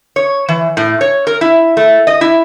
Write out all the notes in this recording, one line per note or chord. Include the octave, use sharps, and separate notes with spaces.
C#5
E3
A2
C#5
A#4
E4
A3
D#5
E4